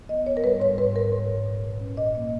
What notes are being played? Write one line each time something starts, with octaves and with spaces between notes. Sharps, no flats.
B3 D#5
G#2 C#5
A#4
G3 B4
G#2 C#5
G#2 B4
G#2 A#4
G#2
G#2
A#2
A#2
C#4
A#2 D#5
A#3